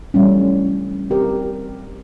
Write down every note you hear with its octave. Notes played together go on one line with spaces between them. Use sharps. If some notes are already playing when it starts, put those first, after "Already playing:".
E3 G3 A3 C#4
C4 G4 A#4